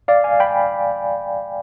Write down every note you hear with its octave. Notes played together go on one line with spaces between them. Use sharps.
D5 F5
F5 G#5
G5 B5